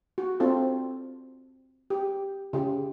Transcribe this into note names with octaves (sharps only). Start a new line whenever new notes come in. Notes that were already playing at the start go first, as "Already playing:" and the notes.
F#4
C4 D4 F4 A4
G4
C#3 G4